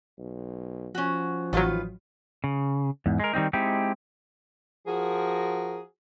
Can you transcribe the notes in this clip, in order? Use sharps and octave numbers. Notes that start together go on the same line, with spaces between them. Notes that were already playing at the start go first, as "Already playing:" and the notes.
B1
F3 C#4 F#4
A1 D#3 F#3 F4 B4
C#3
E2 G#2
G#3 A#4
D#3 G3 C4 D#4
G#3 C4 D#4 E4 G4
F3 F#4 G#4 A#4